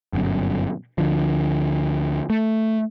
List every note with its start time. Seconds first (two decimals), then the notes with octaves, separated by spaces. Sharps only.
0.13 G1 F#2 B2
0.98 D2 D3 F3
2.30 A3